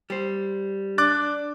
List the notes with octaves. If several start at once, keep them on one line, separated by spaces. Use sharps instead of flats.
G3 C5
D4 D6 F#6 A6